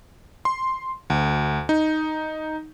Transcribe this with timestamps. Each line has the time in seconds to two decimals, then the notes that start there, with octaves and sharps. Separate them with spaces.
0.45 C6
1.10 D2
1.69 D#4